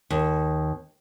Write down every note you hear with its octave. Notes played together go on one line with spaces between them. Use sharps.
D#2